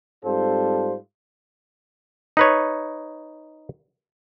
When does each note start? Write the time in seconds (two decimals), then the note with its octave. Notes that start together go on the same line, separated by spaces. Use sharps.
0.25 G#2 G3 C4 F4 A4 C5
2.37 D#4 B4 C#5